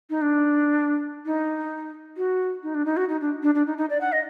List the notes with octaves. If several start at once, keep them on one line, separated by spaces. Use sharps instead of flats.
D#4
D4
D#4
F#4
D#4
D4
D#4
F#4
D#4
D4
D4
D4
D#4
D#4
D5
F#5
D#5